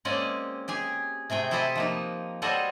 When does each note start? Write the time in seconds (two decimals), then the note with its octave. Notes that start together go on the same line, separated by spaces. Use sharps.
0.05 G#3 A#3 C4 C#4 D5 D#5
0.68 G4 G#4 G#5
1.30 C3 A3 G#4 G5
1.51 E4 G4 A4 C5 D#5 E5
1.75 F3 A#3 D#4
2.42 G3 F#4 A4 C5 C#5 D#5